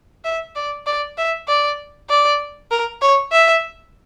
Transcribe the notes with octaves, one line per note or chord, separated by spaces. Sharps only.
E5
D5
D5
E5
D5
D5
A#4
C#5
E5